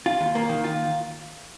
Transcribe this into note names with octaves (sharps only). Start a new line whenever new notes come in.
F4
D#2
A#3
D#3
F4